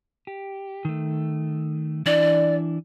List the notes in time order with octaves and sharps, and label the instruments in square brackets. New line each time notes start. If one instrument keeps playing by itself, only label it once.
[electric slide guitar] G4
D#3 A3
[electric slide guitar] E3 D4 E4 [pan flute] D5